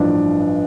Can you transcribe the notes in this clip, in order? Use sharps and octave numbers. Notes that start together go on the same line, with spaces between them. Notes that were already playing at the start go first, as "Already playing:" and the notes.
Already playing: A1 G2 F3 D4